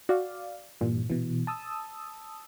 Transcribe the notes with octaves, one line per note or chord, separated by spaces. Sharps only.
F#4 D5 F5
G2 A#2 E3 G3
B2 E3
A5 D#6 E6